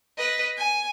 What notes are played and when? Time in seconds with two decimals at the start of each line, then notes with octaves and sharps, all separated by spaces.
0.17 B4 D#5
0.57 G#5